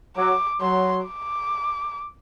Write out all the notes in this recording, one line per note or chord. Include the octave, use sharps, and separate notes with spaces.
F#3 D6
F#3 C6
D6